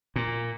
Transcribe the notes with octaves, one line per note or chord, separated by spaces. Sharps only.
A#2